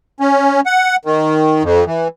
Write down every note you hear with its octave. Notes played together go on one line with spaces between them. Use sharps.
C#4
F#5
D#3
F2
E3